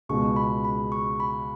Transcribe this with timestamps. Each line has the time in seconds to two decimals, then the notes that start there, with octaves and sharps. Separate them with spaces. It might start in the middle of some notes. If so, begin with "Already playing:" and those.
0.09 C#2 B2 G#3 C#6
0.36 B5
0.65 B5
0.92 C#6
1.20 B5